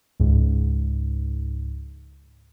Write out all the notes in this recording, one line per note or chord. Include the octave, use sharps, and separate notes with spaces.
C#2 G#2